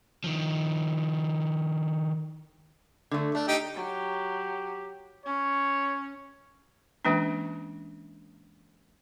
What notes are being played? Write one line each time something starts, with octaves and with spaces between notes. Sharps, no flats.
D#3 F3
D3 A3
A3 D4
D#4 G4
F#3 G4
C#4 C#5
E3 G#3 A#3 C#4 D4